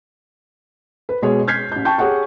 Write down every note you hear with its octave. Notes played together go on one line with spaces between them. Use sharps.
B4
B2 G#3 G#4 C#5
F6 G6 G#6 B6 C7
A1 G6
G5 A5 C#6 G6
G4 G#4 C#5 F#5 C#6